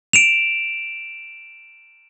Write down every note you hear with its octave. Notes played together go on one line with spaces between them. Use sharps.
D7 E7 F7